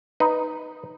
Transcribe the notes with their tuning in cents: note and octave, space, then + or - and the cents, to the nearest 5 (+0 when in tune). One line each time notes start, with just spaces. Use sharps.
D#4 +0 B4 +0